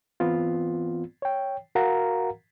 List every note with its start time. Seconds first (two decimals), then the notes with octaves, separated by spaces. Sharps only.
0.20 E3 B3 C4 F4
1.22 C#5 G5
1.75 F#4 A#4 F5 F#5 A#5